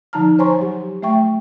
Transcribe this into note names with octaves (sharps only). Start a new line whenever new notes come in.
D3 F3 D#4 A5 A#5 F6
C5 C#5 G#5 A#5 C6 C#6
F#3 G4
A3 E5 G5 C#6